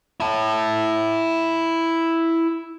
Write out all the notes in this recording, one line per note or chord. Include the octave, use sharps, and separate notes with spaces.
E4 A5